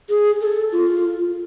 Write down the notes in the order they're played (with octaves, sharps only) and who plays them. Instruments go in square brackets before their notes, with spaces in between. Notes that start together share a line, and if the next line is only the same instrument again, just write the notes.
[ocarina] G#4
A4
F4